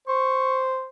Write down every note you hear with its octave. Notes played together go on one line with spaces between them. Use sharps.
C5 C#6